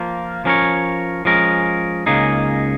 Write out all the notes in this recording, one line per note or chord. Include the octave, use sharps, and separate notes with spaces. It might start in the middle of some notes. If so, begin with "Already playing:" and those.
Already playing: F3 A#3 F4
F3 C#4 A#4 C#5
F3 G#3 C#4 A#4
C#2 C#3 A#3 D#4 G#4